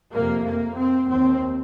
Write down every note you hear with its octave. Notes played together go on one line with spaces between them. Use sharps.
F2 C3 A#3
A#3
C4
D#2 C4